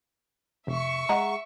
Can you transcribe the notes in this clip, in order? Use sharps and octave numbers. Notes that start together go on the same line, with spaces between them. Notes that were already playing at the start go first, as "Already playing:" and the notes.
F1 E5 C#6
G#3 F#5 A#5